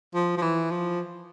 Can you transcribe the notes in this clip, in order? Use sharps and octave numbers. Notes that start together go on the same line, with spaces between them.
F3
F3
E3
F3